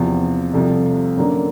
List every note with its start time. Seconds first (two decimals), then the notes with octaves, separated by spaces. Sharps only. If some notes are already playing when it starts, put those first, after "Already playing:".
Already playing: E2 C3 F3
0.54 C2 C3 F3 A3
1.17 F#2 D3 F#3 A#3 D4